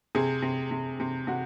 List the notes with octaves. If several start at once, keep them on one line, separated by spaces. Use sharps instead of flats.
C3 G#4
C3
C3
C3
C3 F#4